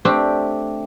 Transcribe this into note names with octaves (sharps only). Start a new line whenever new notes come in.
A3 C4 D4 G4